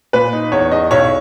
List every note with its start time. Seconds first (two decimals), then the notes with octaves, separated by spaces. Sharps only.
0.13 A#2 B4
0.33 D#4
0.52 E2 C#5
0.71 E2 D#5
0.91 B1 C#5